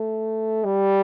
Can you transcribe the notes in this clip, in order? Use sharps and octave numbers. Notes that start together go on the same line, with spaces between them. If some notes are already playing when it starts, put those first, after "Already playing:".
Already playing: A3
G3